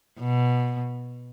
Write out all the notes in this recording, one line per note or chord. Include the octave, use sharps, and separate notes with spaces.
B2